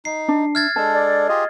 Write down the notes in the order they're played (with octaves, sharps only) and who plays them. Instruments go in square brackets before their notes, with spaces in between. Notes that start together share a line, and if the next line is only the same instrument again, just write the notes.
[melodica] D#4 [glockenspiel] C7
[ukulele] D4
[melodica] E5 [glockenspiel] F6 G#6 A6
[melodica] G#3 D4 A4 [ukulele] A5
[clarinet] D5
[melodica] F4 G4 G#4 [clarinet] D#5